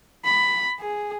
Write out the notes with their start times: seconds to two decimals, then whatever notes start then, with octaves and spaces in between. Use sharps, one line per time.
0.25 B5
0.80 G#4